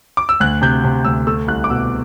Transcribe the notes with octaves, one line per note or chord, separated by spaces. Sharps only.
D6
E6
D2 F#6
C3 G6
C3
D2 E6
A3 E6
C2 F#6
D6
B2 E6